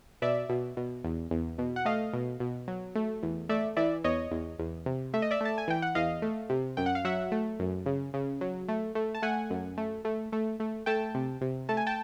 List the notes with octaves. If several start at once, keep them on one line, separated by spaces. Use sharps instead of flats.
B2 D5 E5
B2
B2
E2
E2
B2
F#5
A3 D#5 F5
B2
B2
F#3
A3
E2
A3 D5 E5
E3 D5 E5
E2 C#5 D#5
E2
E2
C3
A3 E5
D#5
D5 E5
A3 A5
G#5
E3 G5
F#5
E2 D#5 F5
A3
C3
F#2 G5
F#5
F5
F#3 E5 F#5
A3
F#2
C#3
C#3
F#3
A3
A3
A5
A3 F#5 G#5
F#2
A3
A3
A3
A3
A3 G5 A5
C3
C3
A3 A5
G#5
G5 A5